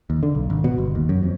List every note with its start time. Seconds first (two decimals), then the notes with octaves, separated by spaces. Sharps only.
0.10 D#2
0.23 D3
0.35 B1
0.50 G#1
0.64 B2
0.78 G1
0.95 D#2
1.09 F#2
1.23 F2